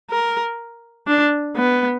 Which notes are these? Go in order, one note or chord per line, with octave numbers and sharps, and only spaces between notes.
A#4
D4
B3